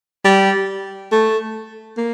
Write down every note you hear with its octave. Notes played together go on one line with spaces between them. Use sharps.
G3
A3
A#3